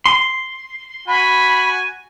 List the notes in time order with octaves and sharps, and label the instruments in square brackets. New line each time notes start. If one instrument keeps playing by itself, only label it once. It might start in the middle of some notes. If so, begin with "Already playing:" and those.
[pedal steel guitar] C6
[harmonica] F#4 G#5 [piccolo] B5